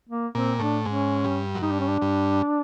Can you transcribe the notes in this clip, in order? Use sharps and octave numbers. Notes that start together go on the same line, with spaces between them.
A#3
A#2 C4
A2 D4
G#2 C#4
G2
F#2
G2 D#4
D4
C#4
D4
G2